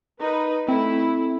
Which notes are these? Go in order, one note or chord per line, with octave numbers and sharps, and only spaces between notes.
D#4 B4
A3 C4 E4